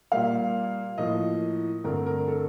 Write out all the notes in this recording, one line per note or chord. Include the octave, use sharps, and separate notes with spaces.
A#2 G3 A#3 F5
A2 F3 A#3 D#5
G2 D3 A3 C4 A#4
A#4
A4